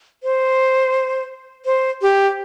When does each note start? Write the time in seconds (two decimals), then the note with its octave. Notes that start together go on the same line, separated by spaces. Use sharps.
0.23 C5
1.66 C5
2.02 G4